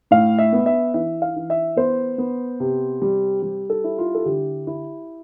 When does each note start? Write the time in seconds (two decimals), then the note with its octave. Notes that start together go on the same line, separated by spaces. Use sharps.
0.11 A2 F5
0.38 E5
0.52 B3
0.66 E5
0.94 E3 E5
1.22 F5
1.36 E3
1.50 E5
1.77 B3 C5
2.18 B3
2.60 C3
3.02 G3
3.42 G3
3.70 A4
3.84 E4
3.98 F4
4.15 A4
4.25 D3 G4
4.67 E4